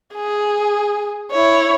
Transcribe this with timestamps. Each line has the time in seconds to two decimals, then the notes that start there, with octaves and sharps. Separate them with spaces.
0.15 G#4
1.31 E4 C#5